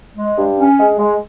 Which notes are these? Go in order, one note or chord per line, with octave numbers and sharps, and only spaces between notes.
G#3
G2
C#4
G#3
G#3